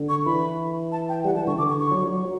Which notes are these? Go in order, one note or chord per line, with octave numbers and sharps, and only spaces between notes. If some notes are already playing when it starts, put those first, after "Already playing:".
Already playing: D3
C#6
E3 B5
A5
G5
G3 F#5
E3 A5
D3 C#6
D3 D6
C#6
C#6
F#3
F#3